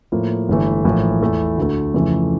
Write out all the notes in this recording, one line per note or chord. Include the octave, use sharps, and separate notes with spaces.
A2 F3 A#3
G1 G2 E3 A3
A#1 A2 E3 A#3
E2 E3 A3 E4
D2 D3 A3
F2 C#3 E3 A3